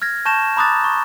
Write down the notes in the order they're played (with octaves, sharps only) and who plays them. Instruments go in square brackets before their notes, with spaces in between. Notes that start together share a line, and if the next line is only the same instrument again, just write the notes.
[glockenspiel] F6 G#6 A#6
A5 C#6 G6 A#6 E7
A#5 B5 D6 D#6 F#6 A6
C#6